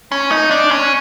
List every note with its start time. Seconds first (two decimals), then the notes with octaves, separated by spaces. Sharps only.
0.12 C#4
0.31 D#4
0.51 D4
0.71 C#4